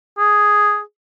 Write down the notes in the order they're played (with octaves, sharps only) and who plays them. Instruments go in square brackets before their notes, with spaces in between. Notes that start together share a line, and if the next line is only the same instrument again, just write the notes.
[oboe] G#4